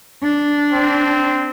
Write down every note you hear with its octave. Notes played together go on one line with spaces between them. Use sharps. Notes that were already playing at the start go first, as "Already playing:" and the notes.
D4
C4